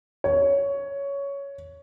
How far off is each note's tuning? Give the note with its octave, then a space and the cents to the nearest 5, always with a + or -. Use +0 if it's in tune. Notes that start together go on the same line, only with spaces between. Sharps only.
C#5 +10